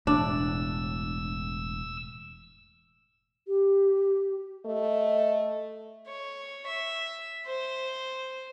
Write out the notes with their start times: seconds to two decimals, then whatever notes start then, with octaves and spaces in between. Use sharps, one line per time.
0.07 E1 A2 D4 E6
3.47 G4
4.66 A3 D#5
6.07 C#5
6.67 E5
7.47 C5